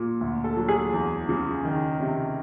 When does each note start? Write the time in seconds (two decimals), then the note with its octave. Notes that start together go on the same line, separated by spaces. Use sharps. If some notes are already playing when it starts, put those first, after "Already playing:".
Already playing: A#2
0.21 D2
0.44 A4
0.57 F#3
0.68 G#4
0.93 E2
1.29 C#3
1.65 D#3
2.00 C3